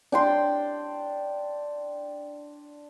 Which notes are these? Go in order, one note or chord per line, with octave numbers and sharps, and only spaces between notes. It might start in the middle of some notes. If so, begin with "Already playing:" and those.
D4 G5 C6